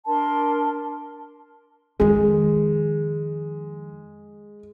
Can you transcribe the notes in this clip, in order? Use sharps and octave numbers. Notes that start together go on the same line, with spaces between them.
D4 A#4 A5 C6
F2 D#3 G#3